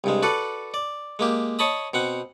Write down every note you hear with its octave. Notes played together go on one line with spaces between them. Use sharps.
C2 G2 G#3
F#4 A4 B4 D5
D5
G#3 A#3 G4
C#5 D#5 A5 B5 D#6
B2 C4 F#5